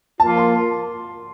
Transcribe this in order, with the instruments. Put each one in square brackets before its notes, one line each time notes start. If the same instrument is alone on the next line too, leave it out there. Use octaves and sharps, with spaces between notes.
[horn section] F3 A#3 F4 [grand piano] A5
[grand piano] C6